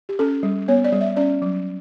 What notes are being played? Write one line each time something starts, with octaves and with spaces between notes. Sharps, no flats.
G4
C#4 A4
G3
B3 C#5
D5
G3
E5
C#4 D5
F#3